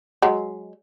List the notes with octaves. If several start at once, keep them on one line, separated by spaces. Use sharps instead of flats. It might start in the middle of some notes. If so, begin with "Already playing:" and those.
F#3 G#3